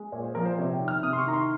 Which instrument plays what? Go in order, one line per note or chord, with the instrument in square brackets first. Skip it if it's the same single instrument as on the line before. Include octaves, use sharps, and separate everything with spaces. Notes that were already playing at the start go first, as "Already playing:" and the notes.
Already playing: [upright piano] G#3
A#2 C#5
C5
F3 A#4
C5
C3 C#5
G5
D#3
F6
C3 D#6
C6
C#6
D#3 A#5
C6